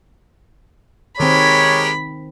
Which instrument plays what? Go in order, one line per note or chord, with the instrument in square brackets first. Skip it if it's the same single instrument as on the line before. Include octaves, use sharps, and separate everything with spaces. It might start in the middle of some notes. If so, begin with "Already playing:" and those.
[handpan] D#3 C4 [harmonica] G#3 G4 A#4 [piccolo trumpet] C#5 [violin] B5